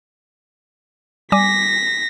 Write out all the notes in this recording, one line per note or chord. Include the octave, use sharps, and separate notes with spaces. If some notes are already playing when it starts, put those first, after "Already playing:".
G3 G#5 D6 A#6 B6